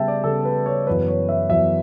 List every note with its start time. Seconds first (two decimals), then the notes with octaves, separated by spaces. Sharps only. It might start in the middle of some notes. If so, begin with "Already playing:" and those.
Already playing: C#3 G3 B3 E5 G5 A5
0.08 D5
0.24 C#3 G3 B3 A4
0.45 B4
0.66 C#5
0.87 F#2 E3 B3 B4
1.08 C#5
1.29 E5
1.50 F#2 E3 B3 E5